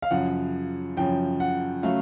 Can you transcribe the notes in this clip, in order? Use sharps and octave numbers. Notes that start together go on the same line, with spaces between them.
F5
F#2 C#3 F3 F#5
F#2 C#3 F3 G5
F#5
C#3 F#3 A3 F5